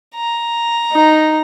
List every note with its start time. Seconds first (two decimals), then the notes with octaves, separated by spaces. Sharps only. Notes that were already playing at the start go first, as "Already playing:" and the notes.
0.15 A#5
0.92 D#4